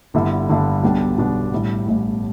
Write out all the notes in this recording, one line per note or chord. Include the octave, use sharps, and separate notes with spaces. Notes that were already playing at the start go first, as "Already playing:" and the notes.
G1 G2 D3 G3 E4
G1 G2 D3 G3 E4
B1 B2 G3 D4 G4
B1 B2 G3 D4 G4
A1 A2 G3 E4
A1 A2 G3 E4